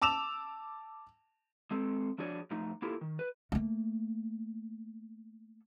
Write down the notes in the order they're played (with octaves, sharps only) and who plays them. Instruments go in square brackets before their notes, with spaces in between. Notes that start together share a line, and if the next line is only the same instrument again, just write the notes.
[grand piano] A5 D6 E6 E7 F7
[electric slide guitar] G#3 C4 A4
F3 D4 F#4 G#4 C#5 D5
F#2 F3 A3 D#4
A#3 E4 F4 G4 A4 A#4
D#3
B4
[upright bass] A3 A#3